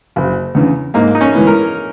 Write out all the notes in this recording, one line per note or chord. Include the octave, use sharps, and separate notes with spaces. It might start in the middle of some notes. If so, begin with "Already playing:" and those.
F#1
E2 C#3
G#2 A#3
D#4
C#4
E3 G#3 B3 E4
A#4